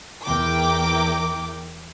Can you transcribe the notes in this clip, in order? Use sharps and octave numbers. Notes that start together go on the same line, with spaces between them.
E2 E4 A#4 G5 D6